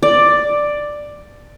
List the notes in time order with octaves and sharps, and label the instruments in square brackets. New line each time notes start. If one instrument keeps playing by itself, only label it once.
[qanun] D5